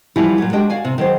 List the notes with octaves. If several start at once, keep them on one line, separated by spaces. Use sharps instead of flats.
E3 F3 G3 E4 F#4
A#2 F#3
G#3 D4 F#4 G4 D#5 G5
F#4 D5 F5 G#5
C3
D#3 F#3 G#4 C5